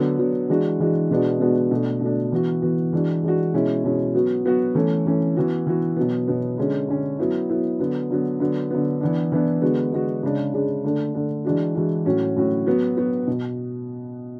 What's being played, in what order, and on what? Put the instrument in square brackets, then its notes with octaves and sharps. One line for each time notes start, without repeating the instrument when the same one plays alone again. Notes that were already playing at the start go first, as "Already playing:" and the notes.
Already playing: [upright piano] D3 F#3 B3
D3 F#3 B3
E3 G#3 D4 F#4
E3 G#3 D4 F#4
B2 G#3 B3 D4 F#4
B2 G#3 B3 D4 F#4
B2 A3 D4
B2 A3 D4
E3 B3 F#4
E3 B3 F#4
E3 G#3 D4 F#4
E3 G#3 D4 F#4
B2 G#3 C#4 E4
B2 G#3 C#4 E4
F#3 B3 F#4
F#3 B3 F#4
E3 A3 C#4
E3 A3 C#4
E3 B3 F#4
E3 B3 F#4
B2 F#3 B3
B2 F#3 B3
D3 G#3 C#4
D3 G#3 C#4
F#3 B3 E4
F#3 B3 E4
D3 F#3 B3
D3 F#3 B3
D3 F#3 B3
D3 F#3 B3
E3 B3 D4
E3 B3 D4
D3 G#3 B3 F#4
D3 G#3 B3 F#4
C#3 G#3 D4
C#3 G#3 D4
D3 A3 D4
D3 A3 D4
E3 G#3 D4 F#4
E3 G#3 D4 F#4
A2 F#3 C#4 F#4
A2 F#3 C#4 F#4
F#3 B3 F#4
F#3 B3 F#4
B2